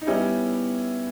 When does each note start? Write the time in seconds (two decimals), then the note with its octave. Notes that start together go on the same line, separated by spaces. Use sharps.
0.02 D#4
0.07 G3 B3 C#4 E4 G4